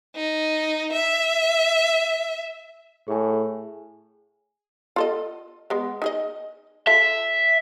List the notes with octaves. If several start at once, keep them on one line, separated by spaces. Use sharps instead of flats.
D#4
E5
A2 G#4 G#5
F4 A4 D#5
G#3 B3
D#4 G#4 D#5
F4 A4 E5